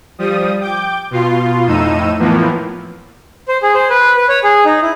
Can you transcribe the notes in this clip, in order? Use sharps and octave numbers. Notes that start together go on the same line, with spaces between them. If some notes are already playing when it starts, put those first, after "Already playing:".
F3 G3 D#6
G5 D6 G6
B2 F4 C6
F2 A2 D#4 E6 D#7
A2 E3 F3 A#3 B3
C5
G#4
C5
B4
B4
C#5
G#4
D#4
E4